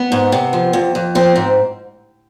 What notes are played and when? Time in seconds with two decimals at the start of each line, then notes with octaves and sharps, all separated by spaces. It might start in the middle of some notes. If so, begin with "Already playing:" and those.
Already playing: B3
0.12 G#2
0.32 C3
0.53 F3
0.73 F2
0.95 F2
1.15 F3 C4
1.36 G#2